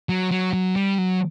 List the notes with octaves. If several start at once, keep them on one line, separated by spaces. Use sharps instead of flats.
F#3
F#3
F#3
G3
F#3